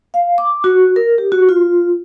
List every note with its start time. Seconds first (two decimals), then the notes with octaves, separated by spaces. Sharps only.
0.14 F5
0.38 D6
0.64 F#4
0.96 A#4
1.18 G4
1.32 F#4
1.49 F4